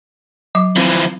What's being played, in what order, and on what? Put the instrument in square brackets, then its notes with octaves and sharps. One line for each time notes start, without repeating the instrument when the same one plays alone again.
[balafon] F#3 D6
[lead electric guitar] E3 F3 [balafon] C4